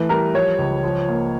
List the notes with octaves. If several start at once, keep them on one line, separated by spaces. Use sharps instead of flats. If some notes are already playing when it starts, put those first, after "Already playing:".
Already playing: E3 A3 B4
G3 A#4
F3 C#5
C#2
F3
A#3